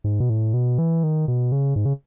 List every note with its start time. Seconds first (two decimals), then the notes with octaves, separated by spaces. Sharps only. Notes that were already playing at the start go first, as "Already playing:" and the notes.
0.04 G#2
0.20 B2
0.30 A2
0.54 B2
0.78 E3
1.03 D#3
1.28 B2
1.52 C#3
1.76 G#2
1.85 C#3